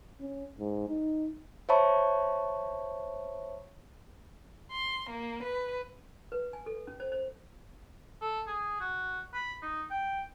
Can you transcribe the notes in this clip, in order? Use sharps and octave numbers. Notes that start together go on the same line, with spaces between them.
C#4
G#2
D#4
C5 C#5 E5 A5 B5 C#6
C6
A#3
B4
B4
G#5
A4
C#4
C5
C5
A4
G#4
F#4
B5
D#4
G5